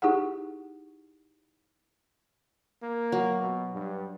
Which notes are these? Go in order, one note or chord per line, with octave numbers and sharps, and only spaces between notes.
D#4 E4 G4 G#4 F#5
A#3
F#3
B2
G2